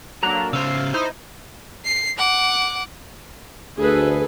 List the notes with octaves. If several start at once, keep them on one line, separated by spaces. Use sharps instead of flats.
F#3 A#3 D4 A4 A#5 F#6
C#3 C5 F5 E6
D#4 E4 C5
C7
F#5 D6
D2 G#4 A4 B4